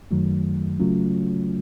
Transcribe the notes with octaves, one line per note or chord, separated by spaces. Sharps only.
F#2 D#3 F#3 A3
C#3 F#3 A3 C#4 F4